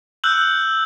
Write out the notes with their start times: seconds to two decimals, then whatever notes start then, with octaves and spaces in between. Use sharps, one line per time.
0.24 E6 F#6 G6 F#7